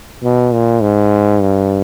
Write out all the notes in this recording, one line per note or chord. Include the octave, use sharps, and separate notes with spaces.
B2
A#2
G#2
G2